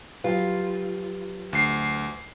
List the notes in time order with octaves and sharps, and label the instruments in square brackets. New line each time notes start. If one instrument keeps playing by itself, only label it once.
[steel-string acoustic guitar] F3 F#3 G4 [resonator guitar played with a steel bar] F4 [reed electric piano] B4
[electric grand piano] D2 C7